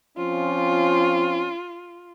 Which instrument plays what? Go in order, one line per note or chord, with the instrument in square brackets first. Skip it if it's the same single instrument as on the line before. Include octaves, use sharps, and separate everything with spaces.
[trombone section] F3 C4 C#4 [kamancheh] F4